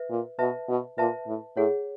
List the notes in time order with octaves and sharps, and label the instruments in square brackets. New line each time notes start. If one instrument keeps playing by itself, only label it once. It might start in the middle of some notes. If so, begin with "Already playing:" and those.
Already playing: [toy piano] B4 E5
[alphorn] A#2
[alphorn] B2 [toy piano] B4 E5 A5
[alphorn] B2
[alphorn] A#2 [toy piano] B4 E5 A5
[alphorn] A2
[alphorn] A2 [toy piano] G#4 C#5 F#5